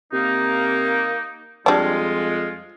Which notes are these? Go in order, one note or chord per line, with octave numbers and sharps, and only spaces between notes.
C3 A#3 D#4
F2 G3 G#3 D4 F4